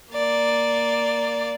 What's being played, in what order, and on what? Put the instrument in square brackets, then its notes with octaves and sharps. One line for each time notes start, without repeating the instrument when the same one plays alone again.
[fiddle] A#3 D5